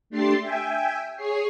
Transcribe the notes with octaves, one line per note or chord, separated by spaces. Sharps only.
A3 D4 G4 C6 A6 C7
E5 G5 G#5
G#4 C#5 C7